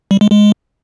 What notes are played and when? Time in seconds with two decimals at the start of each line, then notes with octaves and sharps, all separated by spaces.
0.11 G3
0.21 G#3
0.31 G#3